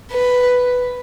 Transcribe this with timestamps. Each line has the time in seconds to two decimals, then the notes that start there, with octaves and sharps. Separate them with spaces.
0.12 B4